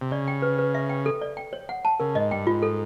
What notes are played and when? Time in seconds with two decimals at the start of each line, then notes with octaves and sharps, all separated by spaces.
0.01 C3
0.11 C#3 D5
0.28 G5
0.42 B4
0.59 B4
0.75 E5
0.89 G5
1.06 A4
1.21 D5
1.37 G5
1.53 C#5
1.69 F#5
1.85 A5
2.00 C#3 A#4
2.15 G#2 D#5
2.31 G2 G5
2.47 G#2 F4
2.62 A4